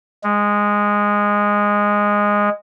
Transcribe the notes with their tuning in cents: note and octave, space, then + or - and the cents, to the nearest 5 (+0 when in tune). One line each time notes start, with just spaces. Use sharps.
G#3 -10